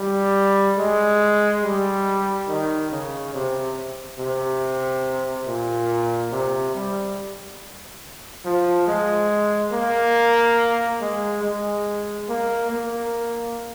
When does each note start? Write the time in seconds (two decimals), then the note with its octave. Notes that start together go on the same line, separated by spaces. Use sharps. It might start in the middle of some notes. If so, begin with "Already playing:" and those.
Already playing: G3
0.78 G#3
1.63 G3
2.48 D#3
2.91 C#3
3.34 C3
4.19 C3
5.46 A#2
6.32 C3
6.74 G3
8.45 F3
8.87 G#3
9.72 A#3
11.01 G#3
11.43 G#3
12.29 A#3
12.71 A#3